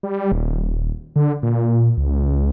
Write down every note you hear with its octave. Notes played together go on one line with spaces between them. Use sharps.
G3
D#1
D3
A#2
C#2